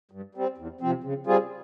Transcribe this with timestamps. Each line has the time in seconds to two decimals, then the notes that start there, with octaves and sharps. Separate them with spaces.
0.11 G2
0.35 G3 C4
0.58 E2
0.81 C3 F3 C4
1.04 C#3
1.27 G3 C4 F4 G#4